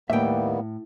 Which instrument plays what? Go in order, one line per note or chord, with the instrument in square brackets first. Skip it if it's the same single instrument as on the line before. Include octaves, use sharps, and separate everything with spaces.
[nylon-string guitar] D#2 G5 [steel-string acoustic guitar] A2 [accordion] G3 A#3 B3 [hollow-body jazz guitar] E5